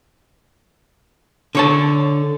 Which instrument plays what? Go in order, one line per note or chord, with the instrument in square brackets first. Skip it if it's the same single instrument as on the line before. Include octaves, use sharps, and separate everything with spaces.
[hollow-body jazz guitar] D3 C#5 A5